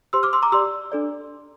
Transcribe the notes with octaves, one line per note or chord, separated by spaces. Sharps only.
G4 C5 C6 E6
D6 F6
C6 E6
A#5 D6
G4 D5 C6 E6
D4 A4 D5